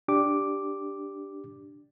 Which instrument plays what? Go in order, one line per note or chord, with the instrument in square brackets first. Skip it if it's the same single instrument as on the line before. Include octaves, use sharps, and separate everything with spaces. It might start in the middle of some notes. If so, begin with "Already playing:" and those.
[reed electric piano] D4 G4 D6